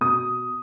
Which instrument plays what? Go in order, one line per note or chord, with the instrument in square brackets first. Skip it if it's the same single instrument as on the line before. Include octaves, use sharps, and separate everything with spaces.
[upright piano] B2 D#6